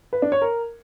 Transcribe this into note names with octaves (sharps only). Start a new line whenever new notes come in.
B4
D4
C#5
A#4